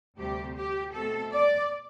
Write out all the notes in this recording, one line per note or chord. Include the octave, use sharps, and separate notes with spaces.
D2 C3 G3 G4
G4
B2 A3 C4 A4
D5